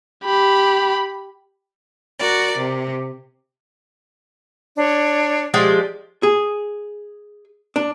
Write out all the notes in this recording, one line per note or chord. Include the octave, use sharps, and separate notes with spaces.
G4 B5
F#4 A#4 D5
C3
D4 C#5
F3 G#3 G4 D5
G#4
D4